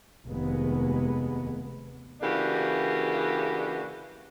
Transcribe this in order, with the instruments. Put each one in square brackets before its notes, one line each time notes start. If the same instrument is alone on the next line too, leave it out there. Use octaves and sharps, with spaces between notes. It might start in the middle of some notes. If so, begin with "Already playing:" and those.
[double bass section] F1 D#2 G#3 B3
[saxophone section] C#3 E3 A#3 D4 F#4 G4